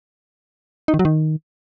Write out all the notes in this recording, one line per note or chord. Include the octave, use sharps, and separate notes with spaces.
D#4
D#3
F#3
D#3